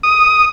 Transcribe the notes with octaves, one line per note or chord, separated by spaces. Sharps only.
D#6